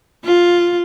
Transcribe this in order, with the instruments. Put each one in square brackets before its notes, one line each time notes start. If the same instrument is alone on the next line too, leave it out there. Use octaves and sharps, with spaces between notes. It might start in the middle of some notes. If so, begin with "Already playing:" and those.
[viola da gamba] F4